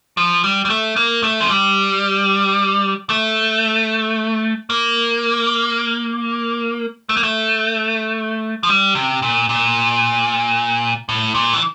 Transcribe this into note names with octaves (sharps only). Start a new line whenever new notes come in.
F3
G3
G3
A3
A#3
A3
F3
G3
A3
A#3
A3
A#3
A3
F3
G3
C3
A#2
A#2
A2
A#2
E3